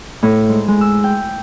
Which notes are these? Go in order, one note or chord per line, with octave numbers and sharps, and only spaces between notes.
A2
G#2
G#3
E6
G5